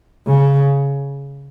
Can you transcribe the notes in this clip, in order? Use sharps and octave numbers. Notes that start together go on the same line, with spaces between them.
C#3